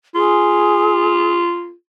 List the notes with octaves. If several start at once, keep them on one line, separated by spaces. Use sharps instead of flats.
F4 G#4